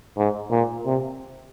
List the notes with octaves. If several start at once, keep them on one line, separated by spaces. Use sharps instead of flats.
G#2
A#2
C3